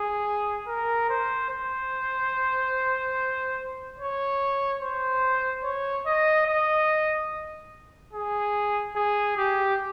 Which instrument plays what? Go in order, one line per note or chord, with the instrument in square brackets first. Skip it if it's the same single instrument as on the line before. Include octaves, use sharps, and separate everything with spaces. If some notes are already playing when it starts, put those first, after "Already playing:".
Already playing: [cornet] G#4
A#4
C5
C5
C#5
C5
C#5
D#5
D#5
G#4
G#4
G4